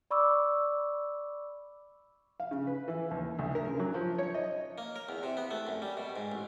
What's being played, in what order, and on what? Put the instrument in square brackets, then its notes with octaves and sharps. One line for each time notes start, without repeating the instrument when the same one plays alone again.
[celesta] D5 B5 C#6 D6 E6
[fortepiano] F5
C#3
B4
E3
D#2
D2
A#4
C#3
F#3
F3
C#5
D#5
[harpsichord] A#3
A#4
E2
C3
B3
A3
F#2
G3
B2
G#2
A1